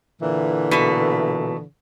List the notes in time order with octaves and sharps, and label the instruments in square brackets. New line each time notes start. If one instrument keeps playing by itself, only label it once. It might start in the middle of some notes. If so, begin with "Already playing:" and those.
[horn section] A#2 D3 E3
[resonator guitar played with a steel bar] B2 A3